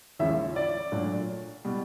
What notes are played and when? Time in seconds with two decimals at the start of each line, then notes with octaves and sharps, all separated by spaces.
0.19 D#2 C#3 F3 E5
0.56 D5
0.92 A#2 F#3 A3 D4
1.65 B2 G3